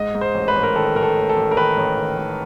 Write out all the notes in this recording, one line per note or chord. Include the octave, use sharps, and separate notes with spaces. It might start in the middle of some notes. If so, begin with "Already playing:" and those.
Already playing: G#2 D#5
G#2
C5
A1
B4
A1
A#4
D#3 A4
A1 A#4
A4
A1
A4
A1
A#4
D#3 B4
A1
D#3
D#3